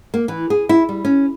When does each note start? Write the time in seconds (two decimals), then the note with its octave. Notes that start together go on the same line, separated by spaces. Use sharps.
0.14 A#3
0.28 E3
0.50 G#4
0.69 E4
0.89 G3
1.05 C#4